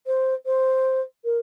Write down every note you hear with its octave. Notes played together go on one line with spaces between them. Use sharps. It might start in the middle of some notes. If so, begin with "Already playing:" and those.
C5
C5
A#4